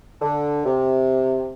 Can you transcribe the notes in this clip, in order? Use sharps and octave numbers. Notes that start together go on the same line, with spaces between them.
D3
C3